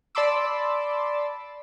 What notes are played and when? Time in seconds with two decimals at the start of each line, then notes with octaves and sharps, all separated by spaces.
0.15 D5 A5 B5 C6 D6 E6